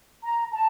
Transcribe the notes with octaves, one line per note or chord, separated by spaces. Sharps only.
A#5
A5